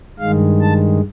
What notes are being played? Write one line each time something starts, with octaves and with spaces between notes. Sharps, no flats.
G2 D#3 G#3 F5
A5